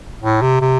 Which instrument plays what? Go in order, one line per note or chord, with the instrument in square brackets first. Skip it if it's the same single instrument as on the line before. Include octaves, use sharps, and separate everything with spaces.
[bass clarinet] A2
C3
C3